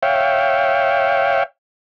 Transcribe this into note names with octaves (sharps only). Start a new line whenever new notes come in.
C#5 E5 F5 G5